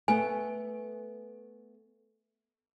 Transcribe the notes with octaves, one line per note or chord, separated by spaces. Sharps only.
A3 B3 G#5